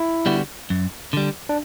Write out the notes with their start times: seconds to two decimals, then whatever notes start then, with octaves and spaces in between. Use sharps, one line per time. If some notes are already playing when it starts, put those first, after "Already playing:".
Already playing: E4
0.26 D3 G3 B3 F#4
0.70 F#2
1.13 D3 G3
1.49 D4